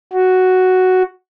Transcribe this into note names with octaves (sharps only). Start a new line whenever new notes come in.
F#4